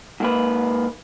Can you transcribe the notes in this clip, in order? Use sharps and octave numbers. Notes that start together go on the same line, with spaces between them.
G#2 A#3 B4